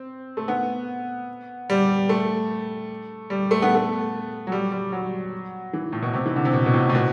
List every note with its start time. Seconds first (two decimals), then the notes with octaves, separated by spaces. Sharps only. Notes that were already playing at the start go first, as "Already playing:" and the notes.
Already playing: C4
0.37 A3
0.48 B3
1.70 G3
2.09 A3
3.30 G3
3.51 A3
3.62 B3
3.74 A3
4.47 F#3
4.52 G3
4.72 G3
4.92 F#3
5.73 E3
5.93 A2
6.02 B2
6.14 C3
6.26 E3
6.36 D3
6.45 C3
6.53 B2
6.66 B2
6.74 A2
6.90 A2
6.95 B2